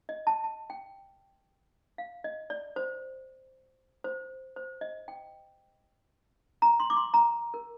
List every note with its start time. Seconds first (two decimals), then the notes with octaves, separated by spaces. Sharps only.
0.09 D#5
0.27 A5
0.44 A5
0.70 G5
1.98 F5
2.24 D#5
2.50 D5
2.76 C5
4.04 C5
4.56 C5
4.81 D#5
5.08 G5
6.62 A#5
6.80 C6
6.90 D6
6.97 C6
7.14 A#5
7.54 A#4